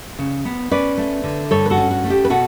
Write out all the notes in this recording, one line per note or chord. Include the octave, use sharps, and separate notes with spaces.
C#3
B3
C#4 B4 D5
A3
D3
G2 A4 C#5
B4
F#4 A4
C#4
F#4
A3
G4
B4
B2 F#4 A4